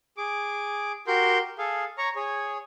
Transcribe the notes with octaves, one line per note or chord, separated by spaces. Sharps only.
G#4 D6
F#4 G4 A#4 C6 G6
G#4 A4 F5
C#5 A#5 C#6
G#4 C#5